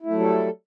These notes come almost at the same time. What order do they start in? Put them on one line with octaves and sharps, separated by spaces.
E4 A3 F#3 G3 A4